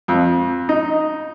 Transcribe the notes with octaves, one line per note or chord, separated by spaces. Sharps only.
F2
D#4